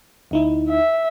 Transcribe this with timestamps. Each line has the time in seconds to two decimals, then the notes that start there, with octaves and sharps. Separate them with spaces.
0.31 D2 D#4 E4
0.69 E5